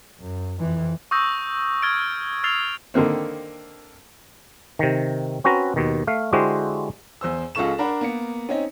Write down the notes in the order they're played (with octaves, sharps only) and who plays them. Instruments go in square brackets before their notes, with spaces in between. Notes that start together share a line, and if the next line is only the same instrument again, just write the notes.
[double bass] F#2
F2 E3
[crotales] C#6 D#6 E6 G6 A#6
E6 F6 G#6 A6 D7
E6 F6 A6 C7 F7
[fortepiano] D3 D#3 A#3 C4
[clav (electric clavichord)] C3 D#3
C4 C#4 F#4 B4 A#5
D#2 B2 D#3
A3 F5
D3 G#3 E4 F#4 G4 C5
[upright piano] E2 C5 E6
C#2 G#3 F4 A4 C#6 E7
D4 A#4 F#5 B5
A#3 B3 C#7
C4 C#4 D#4